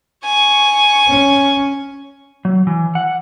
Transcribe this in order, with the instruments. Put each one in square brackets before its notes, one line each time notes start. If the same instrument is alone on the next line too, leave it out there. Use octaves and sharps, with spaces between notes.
[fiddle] G#5 C#6
[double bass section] C#4
[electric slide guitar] F#3
E3
F#5